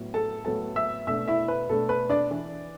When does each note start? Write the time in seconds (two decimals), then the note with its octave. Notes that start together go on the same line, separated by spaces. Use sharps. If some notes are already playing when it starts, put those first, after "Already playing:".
Already playing: A2 F#3 B3
0.14 A4 A5
0.45 A2 F#3 B3 A4 A5
0.76 E5 E6
1.07 B2 A3 D4 E5 E6
1.27 E4 E5
1.48 B4
1.69 B2 A3 D4 A4
1.89 B4
2.10 D4 D5
2.31 E3 D4